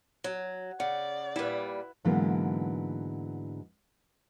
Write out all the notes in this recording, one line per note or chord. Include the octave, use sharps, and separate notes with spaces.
F#3
C#3 D5 F#5
A#2 G3 E4 B4
G#2 D3 E3 F#3 A#3 B3